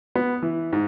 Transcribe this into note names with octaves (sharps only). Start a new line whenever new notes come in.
B3
E3
G#2